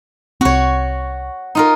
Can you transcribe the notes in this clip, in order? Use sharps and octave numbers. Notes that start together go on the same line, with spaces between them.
C2 C4 F#4 C#5
D#4 F4 A#4